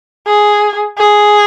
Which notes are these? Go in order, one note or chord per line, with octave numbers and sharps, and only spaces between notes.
G#4
G#4